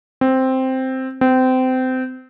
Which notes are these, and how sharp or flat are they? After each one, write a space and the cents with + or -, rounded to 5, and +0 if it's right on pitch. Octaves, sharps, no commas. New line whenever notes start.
C4 +0
C4 -25